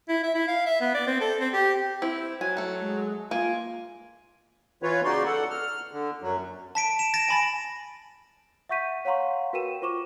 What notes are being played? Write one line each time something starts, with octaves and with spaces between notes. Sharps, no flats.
E4
E5
E4
F5
E5
B3
D5
C4
A4
C4
G4
C4 E4
F#3 G#5
A3 A4
G#3
A#3 F4 G#5
E3 F4 B4 C#5
C#3 D#4 F#4 D5 C6
A4 F#5
F6
D3
F#2 F#3
A5 B6 D7
E7
A6 A#6 D7 E7
G#5 B5 A6
E5 F#5 C#6 G6 B6 D#7
C#5 F5 F#5 A#5 C6 C#6
F#4 A#4 B4 G5 D#7 E7
F4 C5 C#6 D6 E7